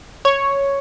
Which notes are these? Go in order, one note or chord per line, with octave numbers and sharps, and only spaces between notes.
C#5